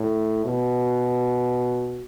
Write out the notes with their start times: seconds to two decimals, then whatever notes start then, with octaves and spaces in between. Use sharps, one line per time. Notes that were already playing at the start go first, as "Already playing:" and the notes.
Already playing: A2
0.45 B2